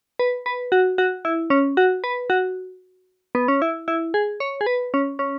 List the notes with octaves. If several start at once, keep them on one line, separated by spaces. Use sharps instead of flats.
B4
B4
F#4
F#4
E4
C#4
F#4
B4
F#4
B3
C#4
E4
E4
G#4
C#5
G#4
B4
C#4
C#4